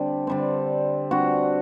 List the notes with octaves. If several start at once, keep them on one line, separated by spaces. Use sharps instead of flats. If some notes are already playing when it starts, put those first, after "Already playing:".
Already playing: D3 G3 C4
D3 G3 C4
D3 G3 C4 F#4